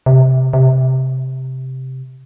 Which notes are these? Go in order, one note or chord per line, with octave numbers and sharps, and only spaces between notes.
C3
C3